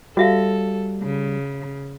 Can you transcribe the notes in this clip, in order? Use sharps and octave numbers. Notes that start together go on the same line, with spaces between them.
G3 F#4 A4 E5 F5
C#3